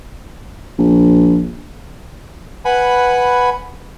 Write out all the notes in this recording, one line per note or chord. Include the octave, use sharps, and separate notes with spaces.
A#1
B4 F#5 G#5 B5